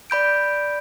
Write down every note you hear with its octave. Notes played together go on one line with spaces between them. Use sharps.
D5 B5 G6 D7